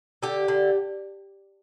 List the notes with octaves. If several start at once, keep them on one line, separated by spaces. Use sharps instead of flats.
D3 G4
D3